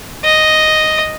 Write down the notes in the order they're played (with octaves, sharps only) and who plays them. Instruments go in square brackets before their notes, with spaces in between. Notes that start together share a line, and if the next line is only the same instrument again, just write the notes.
[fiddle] D#5